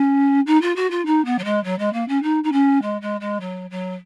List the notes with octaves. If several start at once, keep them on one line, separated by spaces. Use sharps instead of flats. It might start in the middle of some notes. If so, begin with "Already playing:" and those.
Already playing: C#4
D#4
F4
F#4
F4
D#4
B3
F#3
G#3
F#3
G#3
A#3
C#4
D#4
D#4
C#4
G#3
G#3
G#3
F#3
F#3